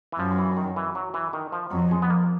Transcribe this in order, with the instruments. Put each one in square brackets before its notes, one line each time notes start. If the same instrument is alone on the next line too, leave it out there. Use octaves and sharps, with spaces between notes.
[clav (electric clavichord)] E3
[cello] F#2 [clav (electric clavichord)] F3
[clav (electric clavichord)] E3
D#3
E3
F#3
E3
D#3
F3
[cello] F2 [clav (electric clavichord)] F#3
[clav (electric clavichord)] G#3
B3
A#3